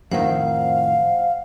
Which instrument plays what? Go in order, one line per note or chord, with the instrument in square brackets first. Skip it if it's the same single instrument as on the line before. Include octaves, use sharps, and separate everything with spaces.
[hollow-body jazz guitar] F2 A2 D#3 [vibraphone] C5 F#5 [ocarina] F5